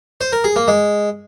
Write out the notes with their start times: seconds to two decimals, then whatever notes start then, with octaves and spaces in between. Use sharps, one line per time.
0.21 C5
0.32 A#4
0.44 G#4
0.56 A#3
0.68 G#3